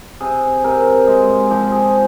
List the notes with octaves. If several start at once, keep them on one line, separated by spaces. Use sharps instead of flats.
C3 G#4
C3 A#4
G#3 G#4
F3 G4
G#4